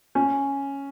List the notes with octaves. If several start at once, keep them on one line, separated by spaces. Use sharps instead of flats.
C#4